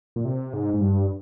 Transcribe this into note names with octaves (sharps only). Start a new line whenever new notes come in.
A#2
C3
G#2
G#2
G2